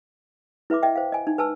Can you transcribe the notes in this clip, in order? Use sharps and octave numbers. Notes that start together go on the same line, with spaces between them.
E4 B4 E5 B5 D6
D#5 E5 G5
C5 F5
D#5 G#5
D#4
B4 G#5 A5 E6